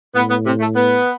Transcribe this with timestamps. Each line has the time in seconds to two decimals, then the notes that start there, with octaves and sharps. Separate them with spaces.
0.15 A2 B3
0.30 B3
0.45 C3
0.60 A3
0.75 B3